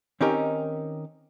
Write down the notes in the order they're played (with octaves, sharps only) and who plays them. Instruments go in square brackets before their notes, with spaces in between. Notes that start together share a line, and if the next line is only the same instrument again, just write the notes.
[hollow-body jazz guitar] D#3 C4 C#4 D#4 G4 A#4